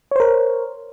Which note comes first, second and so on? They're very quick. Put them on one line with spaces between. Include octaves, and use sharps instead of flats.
C#5 C5 A#4